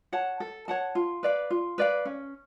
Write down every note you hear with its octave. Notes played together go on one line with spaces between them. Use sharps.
C#5 F#5 A5
A4
C#5 F#5 A5
F4
B4 D5 F5
F4
B4 D5 F5
C#4